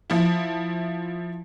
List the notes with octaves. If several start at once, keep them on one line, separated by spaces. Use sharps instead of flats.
F3 E4